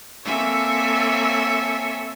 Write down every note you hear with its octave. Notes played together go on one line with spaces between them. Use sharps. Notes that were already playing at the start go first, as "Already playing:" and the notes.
A#3 C4 A4 C#5 E5 G#5